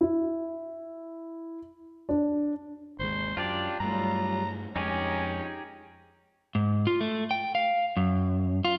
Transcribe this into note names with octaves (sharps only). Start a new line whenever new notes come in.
E4
D4
G#1 D#2 G#3 C5
F#2 D4 F4 G4 D5
G2 F#3 G3 A3 F4 A#5
F2 G#3 C#4 D#4 G4 G#4
G#2
F4
A3
G5
F5
F#2
F4